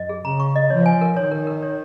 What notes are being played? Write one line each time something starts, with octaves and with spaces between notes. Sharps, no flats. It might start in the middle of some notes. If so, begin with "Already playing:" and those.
Already playing: F#2 D#5
G#4
C#3 A#5
C#6
D#5
F3 C#5
G#5
A#4
D#3 C#5
A#4
A#4
C#5